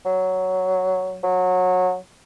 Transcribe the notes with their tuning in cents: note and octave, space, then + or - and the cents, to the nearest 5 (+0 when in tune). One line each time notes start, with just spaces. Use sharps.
F#3 +5
F#3 -20